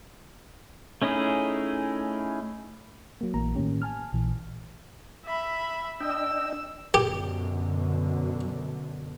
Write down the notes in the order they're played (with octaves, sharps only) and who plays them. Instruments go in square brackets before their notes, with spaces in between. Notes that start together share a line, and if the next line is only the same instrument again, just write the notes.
[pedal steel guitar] A3 C#4 D#4 E4 G#4
[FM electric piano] F#3 A#3
A#1 E3 A#3 A#5
A2 D#3 A#3 C#4 G4
G#5 A5 F6
A#1 A#2 E3
[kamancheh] E5 B5
[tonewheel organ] D4 D#5 G5 [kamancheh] E6
[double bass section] F#2 B2 D3 [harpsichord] G4